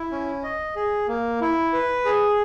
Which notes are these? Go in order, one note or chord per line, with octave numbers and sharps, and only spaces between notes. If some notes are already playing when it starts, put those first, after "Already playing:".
Already playing: E4
C#4
D#5
G#4
A#3
E4
B4
G#4